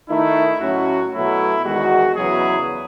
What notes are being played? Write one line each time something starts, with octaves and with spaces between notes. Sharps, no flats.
D#3 A3 D#4 E4
A2 F#3 C#4 F#4
B2 F#3 A3 E4
E2 D#3 G#3 F#4
E2 C#3 F#3 B3 E4 G#4